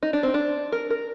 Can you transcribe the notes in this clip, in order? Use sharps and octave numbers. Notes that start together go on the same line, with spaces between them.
D#4
D4
C4
D4
A#4
A#4